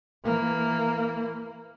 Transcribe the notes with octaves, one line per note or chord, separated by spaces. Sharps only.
E3 A#3